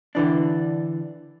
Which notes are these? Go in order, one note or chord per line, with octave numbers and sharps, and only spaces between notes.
D3 E3 D4